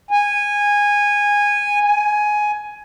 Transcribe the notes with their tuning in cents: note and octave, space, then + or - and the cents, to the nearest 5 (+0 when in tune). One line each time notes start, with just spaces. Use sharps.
G#5 -15
G#5 +10